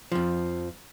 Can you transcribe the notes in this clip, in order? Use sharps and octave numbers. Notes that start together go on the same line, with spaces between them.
F2 F3